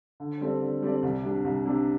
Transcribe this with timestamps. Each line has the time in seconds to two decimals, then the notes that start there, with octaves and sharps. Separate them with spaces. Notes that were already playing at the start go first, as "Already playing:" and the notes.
0.20 D3
0.41 G3 C4 A4 D5
0.62 D3
0.82 G3 C4 A4 D5
1.03 C2
1.24 C3 G3 D4
1.44 C2
1.65 C3 G3 D4